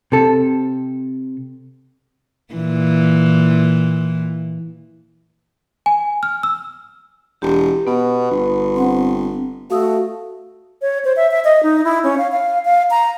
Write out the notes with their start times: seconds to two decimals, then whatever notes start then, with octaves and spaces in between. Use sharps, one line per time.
0.12 C3 A4
2.54 A#2 E3
5.86 G#5
6.23 F6
6.43 E6
7.42 E1 G4
7.87 B2 B3 B4
8.31 G1
8.76 C4 C5 F#5 C6
9.70 A3 F#4 F5 D#6 E6
10.82 C#5
11.05 C5
11.16 E5
11.31 E5
11.45 D#5
11.63 D#4
11.84 E4
12.04 C#4
12.18 F5
12.32 F5
12.65 F5
12.91 A#5